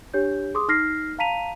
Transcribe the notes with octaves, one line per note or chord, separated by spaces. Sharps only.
D4 G4 C#5 G6
G#4 C6 D6 D#6
D#4 F6 A#6 C7
F5 A5 A#5 B6 D#7 F7